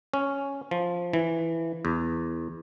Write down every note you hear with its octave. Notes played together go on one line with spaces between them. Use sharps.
C#4
F3
E3
E2